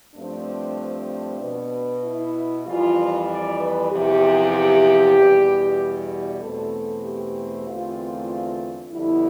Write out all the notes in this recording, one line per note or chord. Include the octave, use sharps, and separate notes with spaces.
G2 F3 A3 C4 D4
B2 B3
E4
F2 E3 G3 F4
D5
B4
E2 C3 F3 G4
E2 B2 G3
E2 B2 A3 C4 A4
G4
E2 D3 A3 C4 F4
F2 D3 G3 B3 E4